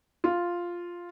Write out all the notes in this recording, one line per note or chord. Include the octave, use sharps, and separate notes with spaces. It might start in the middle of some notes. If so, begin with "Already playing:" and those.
F4